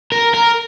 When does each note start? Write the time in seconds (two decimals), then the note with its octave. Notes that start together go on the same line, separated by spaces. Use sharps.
0.12 A#4
0.35 A#4